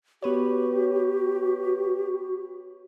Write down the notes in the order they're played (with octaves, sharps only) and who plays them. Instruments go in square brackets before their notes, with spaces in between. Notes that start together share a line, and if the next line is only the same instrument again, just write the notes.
[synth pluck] B3 B4 C#5 [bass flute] F#4 [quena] G4